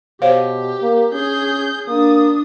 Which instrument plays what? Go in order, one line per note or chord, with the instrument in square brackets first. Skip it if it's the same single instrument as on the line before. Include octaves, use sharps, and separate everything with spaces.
[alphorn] B2 [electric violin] G4 [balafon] C5 C#5 F5
[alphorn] A#3
[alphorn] C#4 [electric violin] G#4 G6
[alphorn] A#3 [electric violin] D4 D#6